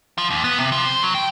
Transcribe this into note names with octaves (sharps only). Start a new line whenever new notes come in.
F3
D#2
B3
C3
F3
C5
F#3
G5